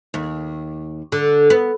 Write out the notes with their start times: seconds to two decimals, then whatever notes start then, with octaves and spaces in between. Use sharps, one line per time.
0.14 D#2
1.12 D3
1.50 B3